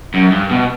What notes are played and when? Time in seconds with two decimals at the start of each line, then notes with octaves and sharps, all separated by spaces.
0.14 F#2
0.32 G2
0.51 B2